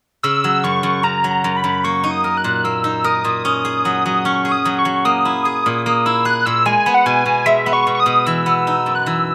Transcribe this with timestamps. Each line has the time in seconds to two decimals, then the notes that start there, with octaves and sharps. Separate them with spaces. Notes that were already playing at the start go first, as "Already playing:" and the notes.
0.23 C#3 E6
0.44 F#3
0.64 F#2 C#6
0.83 F#2
1.03 C#3 A#5
1.24 F#3
1.31 A#5
1.44 F#2
1.57 B5
1.64 F#2
1.84 A#3 C#6
2.04 D#4
2.11 D#6
2.24 A#4
2.37 F#6
2.44 A#2
2.64 A#3 E6
2.84 D#4
3.04 A#4 D#6
3.24 A#2
3.45 C#4
3.65 G#4
3.85 F#3
4.06 F#3
4.25 C#4 C#6
4.45 G#4
4.52 D#6
4.65 F#3
4.79 C#6
4.85 F#3
5.05 A#3 D#6
5.25 E4
5.45 G#4
5.66 A#2
5.86 A#3 D#6
6.06 E4 E6
6.25 G#4 F#6
6.46 A#2 E6
6.66 G#3 G#5
6.86 B3
6.95 F#5
7.06 B2 G#5
7.26 B2
7.46 G#3 E5
7.66 B3
7.73 C#6
7.87 B2
7.95 C#6
8.00 D#6
8.06 B2
8.26 E3 E6
8.46 B3
8.67 D#4
8.86 F#2
8.95 F#6
9.06 E3 E6